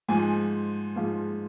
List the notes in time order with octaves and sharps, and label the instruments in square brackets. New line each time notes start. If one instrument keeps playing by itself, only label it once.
[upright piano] G#2 F3 G#3 G#5
G#2 F3 G#3 F5